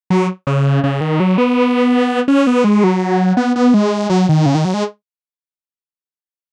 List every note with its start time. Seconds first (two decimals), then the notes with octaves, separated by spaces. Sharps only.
0.10 F#3
0.47 C#3
0.84 C#3
1.01 D#3
1.20 F#3
1.38 B3
2.28 C#4
2.47 B3
2.64 G#3
2.84 F#3
3.37 B3
3.56 B3
3.74 G#3
4.10 F#3
4.29 D#3
4.46 C#3
4.55 D#3
4.65 F#3
4.74 G#3